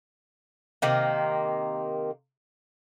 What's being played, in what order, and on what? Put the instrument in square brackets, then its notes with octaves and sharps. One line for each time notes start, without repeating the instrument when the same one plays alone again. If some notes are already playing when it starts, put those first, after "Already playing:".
[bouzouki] C3 D#3 A#3